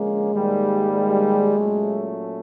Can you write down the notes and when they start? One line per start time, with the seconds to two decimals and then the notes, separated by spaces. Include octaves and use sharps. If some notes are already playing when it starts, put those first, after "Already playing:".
Already playing: D3 F3 G#3 A#3 C#4
0.31 G#2 D#3 G3 A#3
0.93 G#3
1.54 A#2 F#3 A3 C#4